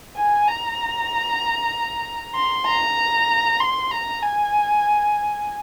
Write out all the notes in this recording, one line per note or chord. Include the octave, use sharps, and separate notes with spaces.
G#5
A#5
C6
A#5
C6
A#5
G#5